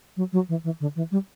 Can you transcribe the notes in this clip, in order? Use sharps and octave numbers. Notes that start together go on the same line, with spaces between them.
F#3
F#3
E3
E3
D3
E3
G3